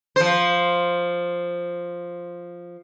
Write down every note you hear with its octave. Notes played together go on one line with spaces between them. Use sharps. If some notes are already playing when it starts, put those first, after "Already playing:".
F3 C5